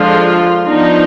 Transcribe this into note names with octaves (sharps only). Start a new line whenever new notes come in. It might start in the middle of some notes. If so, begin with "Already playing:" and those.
Already playing: D3 F3 G#3 D4 F4
F3 B3 D4 D#4